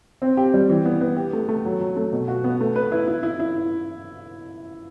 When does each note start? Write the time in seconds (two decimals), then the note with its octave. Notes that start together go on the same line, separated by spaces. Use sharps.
0.22 C4
0.37 G4
0.54 G3
0.69 E3
0.85 B3
1.01 B3
1.17 G4
1.33 A3
1.49 A3
1.65 F#3
1.80 F#3
1.96 A3
2.12 B2
2.28 F#4
2.44 B3
2.61 A3
2.76 B4
2.92 E4
3.08 E4
3.23 E4
3.40 E4